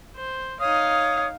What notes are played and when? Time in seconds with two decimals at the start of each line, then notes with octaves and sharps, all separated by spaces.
0.16 C5
0.60 D#4 C#5 F5 D#6